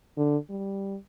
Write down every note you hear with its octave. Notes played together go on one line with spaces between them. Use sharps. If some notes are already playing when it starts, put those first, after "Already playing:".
D3
G3